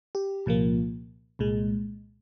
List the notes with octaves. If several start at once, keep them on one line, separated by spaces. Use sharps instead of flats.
G4
C2 A#2 F3 A#3
C2 A#2 G#3